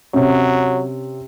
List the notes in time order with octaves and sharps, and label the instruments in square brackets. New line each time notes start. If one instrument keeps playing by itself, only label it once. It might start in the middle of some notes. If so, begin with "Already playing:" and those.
[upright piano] C3 C#4 [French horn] F#3